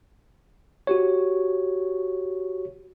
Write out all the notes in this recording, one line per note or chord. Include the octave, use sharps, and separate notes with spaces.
F#4 G4 C#5